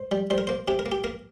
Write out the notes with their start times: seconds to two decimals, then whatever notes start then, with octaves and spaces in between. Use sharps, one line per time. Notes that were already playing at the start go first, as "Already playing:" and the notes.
Already playing: C5
0.11 G3
0.30 G3 C5
0.38 A#4
0.47 A#3 C5
0.68 C3 G4
0.79 A#4
0.86 A#3
0.92 G4
1.04 A#3 A#4